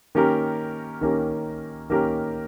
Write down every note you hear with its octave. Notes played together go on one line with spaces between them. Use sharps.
D#3 A#3 C#4 G4 A#4
D#3 A#3 C#4 G4 A#4
D#3 A#3 C#4 G4 A#4